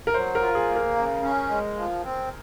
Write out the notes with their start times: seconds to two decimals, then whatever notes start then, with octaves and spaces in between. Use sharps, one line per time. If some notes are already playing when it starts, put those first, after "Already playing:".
0.07 A#4
0.14 F#3 C5
0.35 A#4
0.41 F4
0.55 G#4
0.68 A#3
0.76 A#4
0.95 C#3
1.22 C#4
1.49 G#3
1.76 F3
2.04 C4